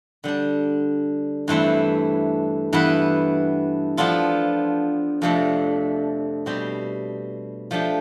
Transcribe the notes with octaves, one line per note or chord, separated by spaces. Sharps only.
D3 G3 D4
G2 E3 A3 C4 E4
G2 E3 B3 E4 B4
F3 B3 D4 F4 A4
F2 C3 F3 A3 D4
B2 G3 C4 G4
F3 A3 D4 G4